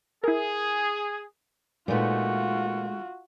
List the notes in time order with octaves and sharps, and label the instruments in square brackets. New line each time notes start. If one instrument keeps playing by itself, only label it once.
[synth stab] E4 A#4 [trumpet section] G#4
[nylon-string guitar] A#2 D#4 B4 [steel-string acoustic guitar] G#3 A3 [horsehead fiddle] F4 F#4